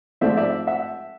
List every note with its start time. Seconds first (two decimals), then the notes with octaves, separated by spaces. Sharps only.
0.21 G#2 F3 A3 C4 D5 E5
0.37 D5 E5
0.67 E5 F#5